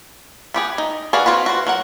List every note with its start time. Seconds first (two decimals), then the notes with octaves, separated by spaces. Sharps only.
0.54 B3 G4 G#4
0.78 D#4
1.13 F#4 G#4 B4 D5 F5
1.26 C4 F4 F#4 B4
1.46 F#4 C5
1.67 F#3 A#4 F#5